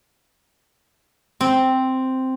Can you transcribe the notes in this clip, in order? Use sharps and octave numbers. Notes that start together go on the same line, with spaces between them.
C4